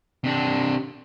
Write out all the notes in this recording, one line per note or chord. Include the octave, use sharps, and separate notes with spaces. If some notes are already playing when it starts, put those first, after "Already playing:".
C3 D4